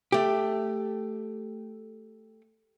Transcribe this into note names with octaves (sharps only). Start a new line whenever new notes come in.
A3 G4